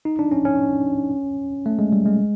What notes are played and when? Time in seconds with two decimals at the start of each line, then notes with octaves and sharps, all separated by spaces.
0.05 D#4
0.19 D4
0.32 C#4
0.45 C#4
1.66 A3
1.79 G#3
1.93 G3
2.06 G#3